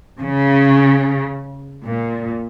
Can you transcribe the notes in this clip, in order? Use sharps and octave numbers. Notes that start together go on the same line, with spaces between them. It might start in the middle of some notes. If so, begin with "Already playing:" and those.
C#3
A#2